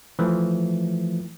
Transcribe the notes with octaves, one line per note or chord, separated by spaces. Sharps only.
E3 F3 A3